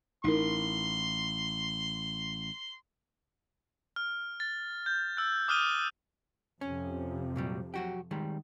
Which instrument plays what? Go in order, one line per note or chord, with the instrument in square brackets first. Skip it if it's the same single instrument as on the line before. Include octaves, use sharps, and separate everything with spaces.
[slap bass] A1 [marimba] D#4 E4 A#4 [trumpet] C6
[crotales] F6
A6
G6
E6 F#6
D6 D#6 F6 F#6 D#7 G7
[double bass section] F2 C3 F3 [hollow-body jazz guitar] C#4
[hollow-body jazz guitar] A#2 F#3 G3
F#3 F#4 G4
D#3 G3 G#3